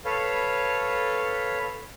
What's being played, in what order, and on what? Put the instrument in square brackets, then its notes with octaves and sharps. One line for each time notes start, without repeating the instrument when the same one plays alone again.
[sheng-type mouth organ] A4 B4 C#5 F5